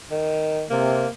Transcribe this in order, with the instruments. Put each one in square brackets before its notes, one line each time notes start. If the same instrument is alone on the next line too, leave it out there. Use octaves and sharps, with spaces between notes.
[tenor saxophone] D#3
[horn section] C3 [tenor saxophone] A#3